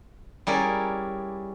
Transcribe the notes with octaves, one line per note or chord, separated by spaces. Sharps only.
G3 C#4 E4 G#4 A#4 D5